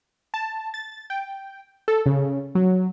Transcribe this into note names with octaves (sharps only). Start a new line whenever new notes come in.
A5
A6
G5
A4
C#3
F#3